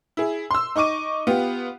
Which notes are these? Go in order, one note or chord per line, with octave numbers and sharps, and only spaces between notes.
E4 G#4
C6 E6
D#4 D#5 C#6 D6 D#7
B3 F4 G4